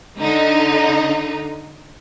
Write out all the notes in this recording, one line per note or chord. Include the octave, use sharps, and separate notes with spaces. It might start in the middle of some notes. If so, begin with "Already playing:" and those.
D3 D#4